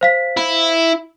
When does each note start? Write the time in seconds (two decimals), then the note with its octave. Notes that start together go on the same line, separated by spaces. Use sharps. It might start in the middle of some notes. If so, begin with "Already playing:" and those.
0.01 C5 F5 B6
0.37 E4